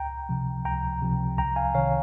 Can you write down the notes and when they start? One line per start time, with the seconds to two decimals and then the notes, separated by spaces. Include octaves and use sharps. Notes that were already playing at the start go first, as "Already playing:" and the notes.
Already playing: C#2 G5 A#5
0.29 C3 F3
0.65 C#2 G5 A#5
1.02 C3 F3
1.38 C2 G5 A#5
1.56 F5 G#5
1.74 C3 D#3 C#5 F5